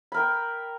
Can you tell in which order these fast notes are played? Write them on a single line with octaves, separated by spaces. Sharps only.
B5 A#4 G5